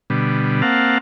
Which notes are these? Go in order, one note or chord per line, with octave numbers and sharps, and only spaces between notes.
B2 D3 G3
A#3 C4 F5 F#5 A5